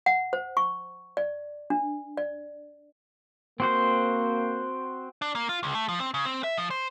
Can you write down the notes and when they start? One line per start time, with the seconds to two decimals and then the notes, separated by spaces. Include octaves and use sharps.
0.06 F#5
0.33 C5
0.57 C#6
1.17 D5
1.70 D4
2.17 D5
3.60 A#3 C4 F#4 C5
5.22 D4
5.35 A#3
5.49 F4
5.63 C#2
5.75 A3
5.89 F3
6.00 C4
6.14 C#3
6.25 C4
6.44 E5
6.58 F3
6.71 C5